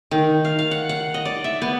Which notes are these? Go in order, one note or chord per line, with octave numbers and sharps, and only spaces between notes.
D#3
F5
F5
F#5
F#5
D#5
D5
E5
B3